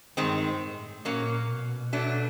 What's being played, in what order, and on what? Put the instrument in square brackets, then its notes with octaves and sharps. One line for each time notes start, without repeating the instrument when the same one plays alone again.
[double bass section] G2 [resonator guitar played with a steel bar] D#3 G#3 C4
[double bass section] A2
[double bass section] A#2 [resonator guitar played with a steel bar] F#3 A#3 C#4
[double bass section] B2
[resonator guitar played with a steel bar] F#3 A3 D4